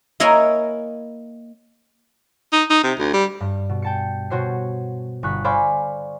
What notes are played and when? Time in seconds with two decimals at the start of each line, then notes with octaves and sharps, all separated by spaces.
0.20 A#3 E4 A#4 C#5 D#5 G#5
2.53 D#4
2.70 D#4
2.84 C3
2.99 D2
3.13 G3
3.41 G2
3.69 B2
3.82 G5 A5 C#7
4.30 B2 F#4 C5 C#5 C7
5.23 G1 C#6 F#6 B6
5.44 C5 D5 F5 G#5 B5 C#6